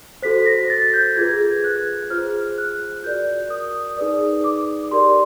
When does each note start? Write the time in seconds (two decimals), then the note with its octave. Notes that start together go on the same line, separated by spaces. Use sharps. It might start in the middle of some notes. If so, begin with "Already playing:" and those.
0.22 F#4 A4 C5 B6
0.46 A#6
0.70 A6
0.93 G6
1.17 F4 G#4 B4 G#6
1.64 F#6
2.10 F4 G#4 C5 F6
2.58 F#6
3.04 F#4 A#4 D5 G6
3.50 D#6
3.97 D#4 G#4 B4 D5 D#6
4.44 D6
4.91 G4 A#4 D5 C6